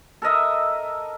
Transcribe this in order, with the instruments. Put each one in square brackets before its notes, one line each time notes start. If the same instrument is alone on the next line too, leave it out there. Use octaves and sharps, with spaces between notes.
[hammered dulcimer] A4 A#4 D#5 E5